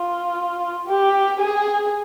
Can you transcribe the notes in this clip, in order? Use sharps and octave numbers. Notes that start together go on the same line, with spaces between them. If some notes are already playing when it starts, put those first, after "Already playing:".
Already playing: F4
G4
G#4